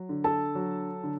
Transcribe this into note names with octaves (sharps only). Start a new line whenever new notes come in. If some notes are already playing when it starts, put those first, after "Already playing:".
Already playing: F#3
D3
A4 A5
F#3
D3